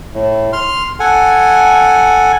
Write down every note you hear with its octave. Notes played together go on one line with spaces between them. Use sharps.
A2
C6 F6
A4 F#5 G#5